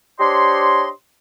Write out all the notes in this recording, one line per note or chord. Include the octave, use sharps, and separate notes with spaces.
D4 G4 C5 C#5 D#5 C6